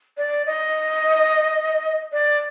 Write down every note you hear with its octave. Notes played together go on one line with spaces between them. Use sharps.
D5
D#5
D5